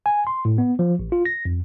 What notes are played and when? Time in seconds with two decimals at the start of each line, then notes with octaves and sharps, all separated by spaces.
0.06 G#5
0.27 C6
0.45 A2
0.58 B3
0.79 F3
0.99 A1
1.12 F4
1.25 A#6
1.45 F2